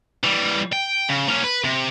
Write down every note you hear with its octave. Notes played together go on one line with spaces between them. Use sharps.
E3 G3
G5
C#3
A#3 C#4
B4
C3